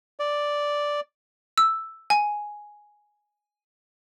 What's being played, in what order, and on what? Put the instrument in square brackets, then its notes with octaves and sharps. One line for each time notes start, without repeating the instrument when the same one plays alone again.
[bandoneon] D5
[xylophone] E6
G#5